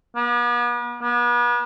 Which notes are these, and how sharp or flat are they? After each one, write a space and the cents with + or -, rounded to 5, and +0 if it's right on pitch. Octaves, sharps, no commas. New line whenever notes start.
B3 -40
B3 -40